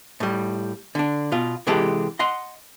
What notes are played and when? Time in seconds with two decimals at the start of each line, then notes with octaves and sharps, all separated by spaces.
0.20 A2 G3
0.95 D3 D4
1.32 B2 F4
1.67 C3 E3 G#3 G4 A4
2.19 D#5 F#5 C6